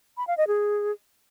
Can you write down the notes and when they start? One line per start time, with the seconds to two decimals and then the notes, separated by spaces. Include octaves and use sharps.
0.17 B5
0.27 F5
0.37 D#5
0.48 G#4